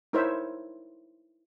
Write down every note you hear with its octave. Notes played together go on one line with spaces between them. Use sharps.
D#4 E4 A#4 C5 C#5 E5